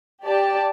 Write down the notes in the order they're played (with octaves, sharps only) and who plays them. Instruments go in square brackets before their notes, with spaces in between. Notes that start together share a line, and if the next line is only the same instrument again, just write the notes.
[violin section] G4 D5 A5